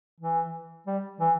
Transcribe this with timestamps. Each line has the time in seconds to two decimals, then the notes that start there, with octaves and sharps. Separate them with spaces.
0.21 E3
0.87 G3
1.20 E3